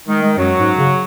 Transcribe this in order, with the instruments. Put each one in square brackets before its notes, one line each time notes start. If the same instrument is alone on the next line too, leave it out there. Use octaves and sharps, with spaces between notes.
[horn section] D#3 [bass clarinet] G#3
[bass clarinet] G#3
[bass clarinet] F#2 [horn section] F#3
[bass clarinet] G#2
C#3